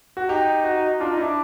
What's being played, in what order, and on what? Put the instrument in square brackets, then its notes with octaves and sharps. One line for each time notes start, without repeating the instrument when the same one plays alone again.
[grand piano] F#4
[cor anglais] D#4 [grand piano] G4
[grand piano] F#4
[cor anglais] D4 [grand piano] F4
[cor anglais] D#4
[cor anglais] D4 [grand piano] E4